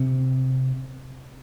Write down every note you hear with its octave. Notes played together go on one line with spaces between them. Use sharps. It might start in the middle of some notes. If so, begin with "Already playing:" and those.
Already playing: C3